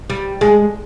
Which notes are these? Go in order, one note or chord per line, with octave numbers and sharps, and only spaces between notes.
G3
G#3